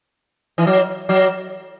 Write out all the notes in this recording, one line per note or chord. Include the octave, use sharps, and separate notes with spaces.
E3
F#3
F#3